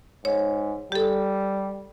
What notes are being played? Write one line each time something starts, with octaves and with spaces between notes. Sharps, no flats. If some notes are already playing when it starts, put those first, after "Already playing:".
G#2 C#5
G3 G4 A4